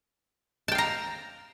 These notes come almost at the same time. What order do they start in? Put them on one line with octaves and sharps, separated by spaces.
A5 G5 F5 A#5